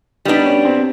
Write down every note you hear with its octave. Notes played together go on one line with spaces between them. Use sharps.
G3 B3 D4 D#4
C#4
C4